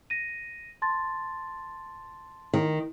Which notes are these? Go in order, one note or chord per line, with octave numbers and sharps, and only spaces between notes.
A#6 D#7
A5 C6 A6
D#3